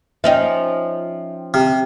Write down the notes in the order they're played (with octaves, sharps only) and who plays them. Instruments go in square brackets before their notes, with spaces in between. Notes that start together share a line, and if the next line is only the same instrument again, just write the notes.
[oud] F3 C#4 D#4 [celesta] E5 G5
[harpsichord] C3 [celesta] F6